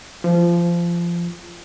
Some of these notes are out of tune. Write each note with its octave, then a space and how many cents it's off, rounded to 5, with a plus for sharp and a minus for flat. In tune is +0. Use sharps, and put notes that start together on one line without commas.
F3 -20